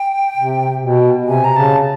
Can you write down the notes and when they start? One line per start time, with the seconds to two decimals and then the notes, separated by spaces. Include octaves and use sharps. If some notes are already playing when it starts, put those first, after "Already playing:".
Already playing: G5
0.37 C3
0.82 B2
1.26 C3 G#5
1.44 A#5
1.56 C#3 A5